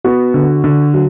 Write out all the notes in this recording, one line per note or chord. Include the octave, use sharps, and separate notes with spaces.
B3 F#4
D3
D3
F#3